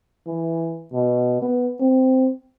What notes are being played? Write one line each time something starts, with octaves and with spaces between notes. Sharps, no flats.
E3
B2
B3
C4